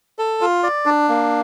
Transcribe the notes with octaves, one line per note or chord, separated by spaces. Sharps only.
A4
F4
D5
D4
A#3